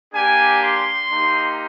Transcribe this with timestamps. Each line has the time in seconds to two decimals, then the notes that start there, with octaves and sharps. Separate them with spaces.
0.13 A#3 D4 G4 G#5
0.62 C6
1.11 A#3 D#4 G4